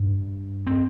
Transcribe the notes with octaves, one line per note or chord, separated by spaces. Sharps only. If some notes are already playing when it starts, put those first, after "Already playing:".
Already playing: G2
C4